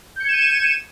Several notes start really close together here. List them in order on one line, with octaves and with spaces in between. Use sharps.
G6 C#7 G#6 E7 D#7